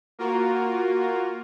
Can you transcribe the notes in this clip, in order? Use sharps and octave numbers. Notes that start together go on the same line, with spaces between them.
A#3 F4 F#4 A#4